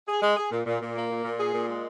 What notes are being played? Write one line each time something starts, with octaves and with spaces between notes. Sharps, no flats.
G#4
G#3
G#4
A#2
A#2
A#2
A#3
A#2
A#2
G#4
A#2
G#3